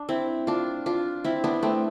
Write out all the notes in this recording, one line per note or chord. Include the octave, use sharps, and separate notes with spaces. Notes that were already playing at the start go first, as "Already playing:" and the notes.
Already playing: D4
C4 E4
D4 F4
D4 F4
C4 E4
B3 D4
A3 C4